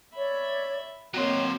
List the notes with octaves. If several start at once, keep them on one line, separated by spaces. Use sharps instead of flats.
C#5 D5 E5 B5
F#3 A#3 C4 C5 C#5 D#5 G5